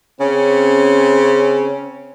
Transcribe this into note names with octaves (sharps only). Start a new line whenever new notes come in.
C#3 C4 C#4